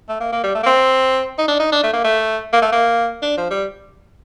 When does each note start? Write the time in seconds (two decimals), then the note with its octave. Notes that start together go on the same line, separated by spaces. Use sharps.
0.09 A3
0.20 A#3
0.33 A#3
0.44 G3
0.55 A3
0.63 A#3
0.67 C4
1.38 D#4
1.48 D4
1.60 D#4
1.72 D4
1.83 A3
1.93 A#3
2.04 A3
2.53 A#3
2.62 A3
2.72 A#3
3.22 D4
3.37 F3
3.50 G3